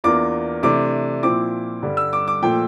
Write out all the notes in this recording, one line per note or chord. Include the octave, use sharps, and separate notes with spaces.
E2 E3 A#3 D4 F4 D6
C3 E3 A3 D4 D6
A#2 F3 C4 E4 D6
G2 D3 G3
E6
D6
D6
A#2 F3 A3 G5